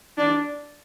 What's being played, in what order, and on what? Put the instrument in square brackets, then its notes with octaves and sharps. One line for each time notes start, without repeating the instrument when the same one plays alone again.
[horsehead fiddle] D4